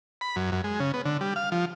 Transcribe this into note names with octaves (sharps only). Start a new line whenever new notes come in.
B5
F#2
F#2
G#3
C#3
B3
D3
G3
F5
F3